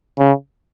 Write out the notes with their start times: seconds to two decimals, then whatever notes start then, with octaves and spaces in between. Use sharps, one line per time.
0.19 C#3